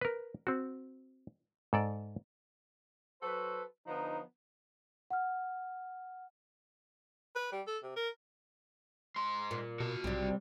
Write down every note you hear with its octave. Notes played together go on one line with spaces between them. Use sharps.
A#4 B4
C4 F#4
G#2 A4 D5
F#3 F#4 A4 B4 C5
D3 F3 B3 D#4
F#5 F6
B4
G3
A4
C3
A#4
G#2 C6
A#2
B2 F#4 A5
B1 C3 G3